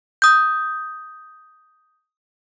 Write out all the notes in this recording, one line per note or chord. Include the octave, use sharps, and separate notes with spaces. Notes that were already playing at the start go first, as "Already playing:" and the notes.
D#6 G6